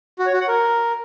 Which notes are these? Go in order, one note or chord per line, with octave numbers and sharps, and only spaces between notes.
F#4
C#5
F#4
F#5
A#4